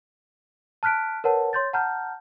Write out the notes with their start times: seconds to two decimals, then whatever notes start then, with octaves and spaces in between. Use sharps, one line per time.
0.83 A5 F6 F#6 B6 D7
1.24 A#4 B4 C#5 F#5 A5
1.53 C#5 C6 G6 A6
1.73 F#5 A5 A#5 F6 G6